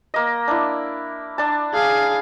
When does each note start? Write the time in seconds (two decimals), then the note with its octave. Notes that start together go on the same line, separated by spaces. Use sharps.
0.14 A#3 D#5
0.48 D4 E4
1.38 D4 A5
1.74 G#4 F5